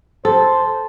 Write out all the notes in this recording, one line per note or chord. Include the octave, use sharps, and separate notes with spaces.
A4 C5